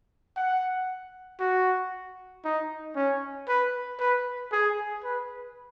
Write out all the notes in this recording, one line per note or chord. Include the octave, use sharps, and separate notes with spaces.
F#5
F#4
D#4
C#4
B4
B4
G#4
B4